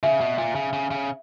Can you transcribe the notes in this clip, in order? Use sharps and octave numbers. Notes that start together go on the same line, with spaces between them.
C#3 E5
B2
A#2
C#3
C#3
C#3